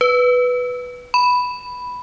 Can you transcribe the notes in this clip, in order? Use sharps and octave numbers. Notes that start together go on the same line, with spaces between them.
B4
B5